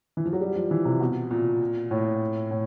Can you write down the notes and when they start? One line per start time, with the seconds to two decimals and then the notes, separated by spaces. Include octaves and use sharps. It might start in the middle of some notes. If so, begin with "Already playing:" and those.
0.17 E3
0.25 F3
0.33 F#3
0.41 G3
0.56 F3
0.71 E3
0.85 C3
1.00 B2
1.31 A#2
1.91 A2
2.51 A2